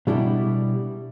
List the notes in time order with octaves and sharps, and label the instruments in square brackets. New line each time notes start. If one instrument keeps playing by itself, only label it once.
[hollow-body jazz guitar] B2 G3 D4 E4 G4